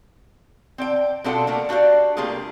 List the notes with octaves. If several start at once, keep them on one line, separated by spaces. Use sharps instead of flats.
C4 D5 G5
B2 C4 D4 F4 A4 F#5
A3 A#3 D4
D4 F#4 G4 D5 F5
C3 G3 A3 A#3 F4 G#4